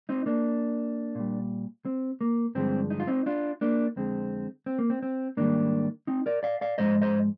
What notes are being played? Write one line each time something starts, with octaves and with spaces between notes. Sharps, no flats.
C4 D#4
A#3 D4
A#2 G3
C4
A#3
G2 D3 F3 G#3 C4
D#4
F4
C4 D#4
D4 F4
A#3 D4
F2 D3 G#3 C4
C4
A#3
C4
C4
G#2 D#3 G3 A#3 D4
C4 D#4
A#4 D5
D5 F5
D5 F5
G#2 F3 G#3 C5 D#5
C5 D#5